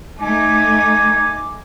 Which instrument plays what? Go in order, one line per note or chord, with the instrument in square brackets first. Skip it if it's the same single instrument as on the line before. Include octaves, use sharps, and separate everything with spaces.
[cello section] A3 D#4 [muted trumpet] G#5 [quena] D6